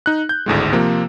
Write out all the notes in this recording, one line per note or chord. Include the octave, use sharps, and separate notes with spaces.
D#4 F#6
G6
G#1 D2 A2 G#3
C3 F3 A#3